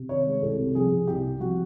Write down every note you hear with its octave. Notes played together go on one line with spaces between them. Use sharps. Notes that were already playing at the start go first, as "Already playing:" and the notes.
Already playing: C3
D#3 C#5
G#3
C2 A4
C3
F3 G#4
C2
C2 G4
C3
F3 F#4